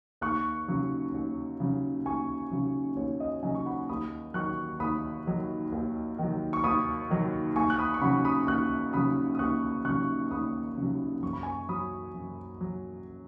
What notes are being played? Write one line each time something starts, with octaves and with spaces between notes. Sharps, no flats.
D#2 C#6 F#6
C#3 F#3
D#2
C#3 F#3
D#2 G#5 C#6
C#3 F#3
D#2 C#5
D#5
C#3 F#3 D#5 G#5
C#6
F#5 B5
D#2 B5 D#6
D#3 F#3 C#6 F#6
D#2 B5 D#6
D#3 F#3
D#2
D#3 F#3
C#6
D#2 B5 D#6
D#3 F#3
D#2 G#5 C#6
F#6
B5 D#6
C#6
C#3 F#3 F#5 B5
B5 D#6
D#2 C#6 F#6
C#3 F#3 B5 D#6
D#6
D#2 C#6 F#6
C#3 F#3 C#6 F#6
D#2 B5 D#6
C#3 F#3
F#2 C#6
B5
G#5 C#6
F#3 B5 D#6
F#2
F#3